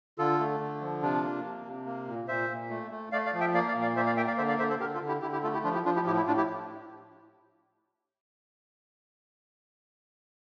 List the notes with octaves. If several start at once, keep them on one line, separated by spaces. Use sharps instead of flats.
D3 F4 A4
A3
D3
F3
C3 D4 F4
A#3
C3
C3
A#3
A#2
A#2 C5 E5
A#2
A3
A3
A3 D5 F5
D5 F5
F3
E5 G5
A#3 D5 F5
D5 F5
A#2
D5 F5
A#3 C5 E5
D5 F5
A#3 E5 G5
D5 F5
D3 C5 E5
D5 F5
D3 C5 E5
A4 C5
D3 G4 A#4
F4 A4
D3
E4 G4
D3 E4 G4
E4 G4
A3 F4 A4
E4 G4
F3 D4 F4
E4 G4
F3 D4 F4
E4 G4
A2 E4 G4
E4
A2 D4 F4
E4 G4